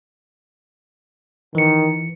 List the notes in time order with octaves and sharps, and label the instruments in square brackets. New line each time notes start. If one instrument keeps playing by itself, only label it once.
[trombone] D#3 [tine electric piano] E3 C#7